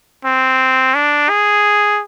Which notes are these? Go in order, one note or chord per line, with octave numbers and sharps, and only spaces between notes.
C4
D4
G#4